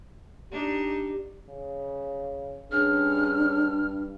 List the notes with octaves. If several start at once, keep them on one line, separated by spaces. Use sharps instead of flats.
D4 D#4 G4
C#3
G2 C#4 D4 G#4 F6